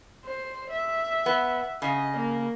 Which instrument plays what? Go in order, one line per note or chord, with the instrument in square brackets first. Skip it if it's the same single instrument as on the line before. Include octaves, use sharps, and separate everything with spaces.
[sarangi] C5
E5
[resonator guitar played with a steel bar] B3
[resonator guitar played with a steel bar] C#3 [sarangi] D#5
[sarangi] A#3